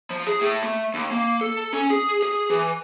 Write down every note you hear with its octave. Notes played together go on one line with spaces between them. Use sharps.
F3
G#4
A2
A3
D#2
A#3
A4
C#4
G#4
G#4
E3